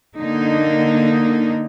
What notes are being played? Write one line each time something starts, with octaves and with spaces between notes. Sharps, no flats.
D3 A#3 D#4